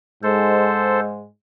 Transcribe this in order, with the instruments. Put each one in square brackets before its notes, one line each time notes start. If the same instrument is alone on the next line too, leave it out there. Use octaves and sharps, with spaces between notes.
[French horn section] G#2 G#3 [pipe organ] A4 C5